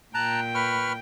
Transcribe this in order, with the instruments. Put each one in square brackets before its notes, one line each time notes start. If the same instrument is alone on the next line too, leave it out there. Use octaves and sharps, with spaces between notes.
[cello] A#2 G5 [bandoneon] A5 A#5 [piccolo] F#6
[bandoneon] B4 C#6 F6 [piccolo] B5